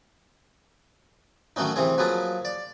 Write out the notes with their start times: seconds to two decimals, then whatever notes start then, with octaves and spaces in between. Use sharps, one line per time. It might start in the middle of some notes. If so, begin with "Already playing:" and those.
1.56 D#3 F#3 A3 B3 C#4 D#4
1.76 C3 E3 C4 G#4
1.98 F3 F#3 A#3 G#4 A4 B4
2.45 D5